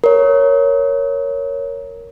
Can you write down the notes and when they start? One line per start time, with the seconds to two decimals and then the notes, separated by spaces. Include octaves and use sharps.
0.04 A#4 C#5